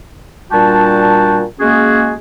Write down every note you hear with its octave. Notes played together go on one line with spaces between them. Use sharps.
A#2 G3 D4 F#4 G5 A5
G#3 A#3 C#4 F#4 G#4